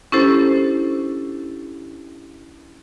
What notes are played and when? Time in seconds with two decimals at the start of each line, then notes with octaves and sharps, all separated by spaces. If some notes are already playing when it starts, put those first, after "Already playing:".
0.12 C#4 D4 E4 G4 A4 C5